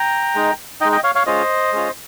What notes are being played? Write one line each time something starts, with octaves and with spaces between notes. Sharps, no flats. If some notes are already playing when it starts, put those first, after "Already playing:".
Already playing: G5 A#5
G#3 D#4
G#3 D#4 D#5 G5
D#5 G5
C#5 F5
C#5 F5
G#3 C#4 F4 C5 D#5
G#3 C#4 F4